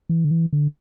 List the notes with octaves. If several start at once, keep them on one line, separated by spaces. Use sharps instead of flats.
E3
D3
E3
D3